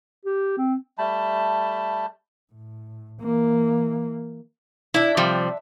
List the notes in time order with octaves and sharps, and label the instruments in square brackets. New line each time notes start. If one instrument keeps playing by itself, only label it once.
[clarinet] G4
C4
[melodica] G3 A3 A5 B5
[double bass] A2
E3 A#3
[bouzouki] D4 E5 [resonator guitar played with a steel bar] E4
[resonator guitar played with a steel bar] C3 F3 G3